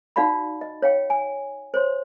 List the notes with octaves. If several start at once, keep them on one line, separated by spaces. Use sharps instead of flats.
D#4 F#4 D5 F5 F#5 B5
D#5
C#5 F5 G5
G#5
C5 C#5 C6